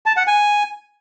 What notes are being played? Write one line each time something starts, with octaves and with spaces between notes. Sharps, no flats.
A5
F#5
G#5